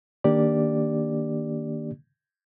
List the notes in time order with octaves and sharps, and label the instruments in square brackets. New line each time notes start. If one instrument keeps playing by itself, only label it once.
[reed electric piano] D#3 A#3 D4 G4 D5